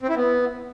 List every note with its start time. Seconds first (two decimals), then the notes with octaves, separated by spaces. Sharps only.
0.03 C4
0.09 E4
0.16 B3